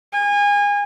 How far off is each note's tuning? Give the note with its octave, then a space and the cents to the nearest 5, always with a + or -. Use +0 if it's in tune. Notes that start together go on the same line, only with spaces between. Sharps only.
G#5 -30